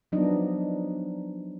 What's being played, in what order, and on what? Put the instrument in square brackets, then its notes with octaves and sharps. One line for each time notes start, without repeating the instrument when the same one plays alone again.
[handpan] F3 F#3 B3 D4 D#4 D#5